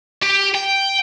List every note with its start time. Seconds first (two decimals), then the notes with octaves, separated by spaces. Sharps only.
0.23 G4
0.54 G5